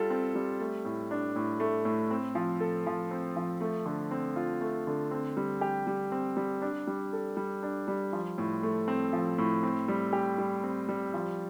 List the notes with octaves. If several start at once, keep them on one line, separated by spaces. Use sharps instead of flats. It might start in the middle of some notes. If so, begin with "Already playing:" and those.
Already playing: G3 F4 A4
C4
G3
A3
A2
D4
A2
A3
A2
C4
F3
A4
F3
C4
F3
A3
D3
C4
F4
A3
D3
C4
G3
G4
G3
C4
G3
D4
G3
A4
G3
D4
G3
F3
A2
A3
C4
F3
A2
C4
G3
G4
G3
C4
G3
F3